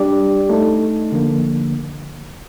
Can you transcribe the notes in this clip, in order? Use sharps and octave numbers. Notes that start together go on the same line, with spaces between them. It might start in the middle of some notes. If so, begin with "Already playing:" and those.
Already playing: G3 D4 G4 D5
A3 D#4 A4
D3 F3 A#3